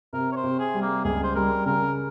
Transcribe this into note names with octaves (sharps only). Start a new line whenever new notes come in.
C3 A#4
C#5
C5
C3
G#4
G3
A#3
C#2 G#4
C5
G3 A#4
C#3 A#4